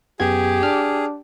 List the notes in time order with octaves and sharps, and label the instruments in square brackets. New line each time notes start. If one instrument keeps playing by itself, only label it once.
[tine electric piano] F#2 B3 G#6 [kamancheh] G4 [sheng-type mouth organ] G#4
[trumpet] D4 [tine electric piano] F6